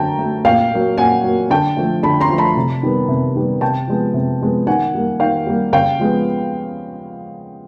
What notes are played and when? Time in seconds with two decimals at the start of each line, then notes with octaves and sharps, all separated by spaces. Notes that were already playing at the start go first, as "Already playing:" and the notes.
Already playing: D3 F#3 A3 G5 A5 A#5
0.18 F#3 A3
0.45 A#2 F5 G5
0.71 F#3 A#3
0.97 A#2 F#5 G#5
1.24 F#3 A#3
1.50 D3 G5 A5
1.77 F3 A3
2.03 D3 A5 B5
2.20 A#5 C6
2.30 F3 A3
2.38 A5 B5
2.57 C3
2.83 D#3 G3 B3
3.09 C3
3.35 D#3 G3 B3
3.61 C3 G5 A5
3.88 F3 G#3 B3
4.14 C3
4.41 F3 G#3 B3
4.67 D#3 F#5 G#5
4.94 G3 A#3
5.20 D#3 F5 G5
5.47 G3 A#3
5.73 C#3 F5 G5
5.99 F3 G#3 B3